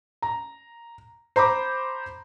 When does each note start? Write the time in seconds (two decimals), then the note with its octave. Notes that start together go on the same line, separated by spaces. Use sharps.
0.22 A#5
1.36 C5 A#5 B5 D6